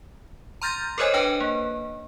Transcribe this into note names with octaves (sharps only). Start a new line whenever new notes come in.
A#5 C6 F6 G6 A6 A#6
A4 A#4 C5 C#5 D#5 G#5
D4 B4 G5 G#5
A#3